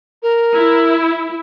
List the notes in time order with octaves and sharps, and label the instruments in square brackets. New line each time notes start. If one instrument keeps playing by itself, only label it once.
[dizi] A#4
[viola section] E4